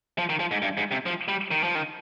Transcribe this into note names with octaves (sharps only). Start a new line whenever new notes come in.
F3
D#3
F3
G#2
G2
G#2
C3
F3
G3
D#3
F3
D#3